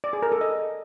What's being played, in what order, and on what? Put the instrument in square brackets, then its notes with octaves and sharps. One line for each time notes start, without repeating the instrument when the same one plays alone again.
[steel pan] D5
G#4
A#4
A4
D#5